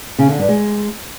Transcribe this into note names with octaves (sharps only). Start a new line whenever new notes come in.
C#3
D3
G2
G#3